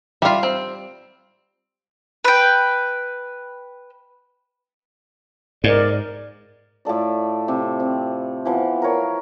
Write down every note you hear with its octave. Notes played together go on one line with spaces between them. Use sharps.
G3 F4 E5 F5
C4
B4 G5
G#2 A#4 D5
A2 F4 A4 D5
C3
C4
E3 F3 B3
A#4 C#5